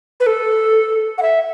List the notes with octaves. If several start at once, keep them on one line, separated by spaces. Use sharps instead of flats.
B4
A4
F#5
E5